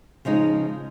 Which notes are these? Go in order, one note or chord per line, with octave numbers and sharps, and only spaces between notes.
C#3 F3 G#3 D#4